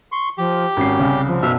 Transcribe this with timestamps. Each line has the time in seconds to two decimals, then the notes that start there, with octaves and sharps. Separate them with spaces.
0.12 C6 C#6
0.38 F3 G4
0.77 G#1 C#4 C7
0.99 C2 C#3
1.27 F3
1.43 B1 F#2 E5 F6